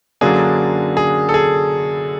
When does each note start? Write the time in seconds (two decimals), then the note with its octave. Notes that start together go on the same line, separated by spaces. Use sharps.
0.21 F#2 D3 F#3 A#3 D4 G#4
0.97 G#4
1.29 A4
1.34 G#4